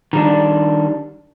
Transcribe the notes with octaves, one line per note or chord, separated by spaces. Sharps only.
D#3 G3 D4